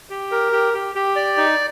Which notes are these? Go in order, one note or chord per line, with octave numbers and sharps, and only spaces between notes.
G4
A#4
G4
G4
G4
D5
D#4